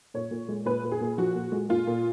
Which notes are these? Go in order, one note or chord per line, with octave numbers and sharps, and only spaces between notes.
A#2 C#5
A#2
G#3
A#2 B4
A#2
G#4
A#2
F3 F#4
A#2
G#3
A#2 F4
A#2